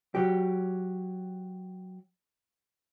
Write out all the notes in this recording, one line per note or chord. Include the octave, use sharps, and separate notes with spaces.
F#3 G4